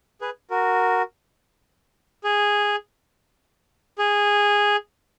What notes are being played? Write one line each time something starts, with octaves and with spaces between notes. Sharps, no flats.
G#4 B4
F#4 A#4
G#4
G#4